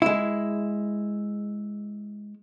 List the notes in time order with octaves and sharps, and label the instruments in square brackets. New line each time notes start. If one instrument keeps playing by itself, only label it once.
[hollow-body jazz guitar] G#3 E4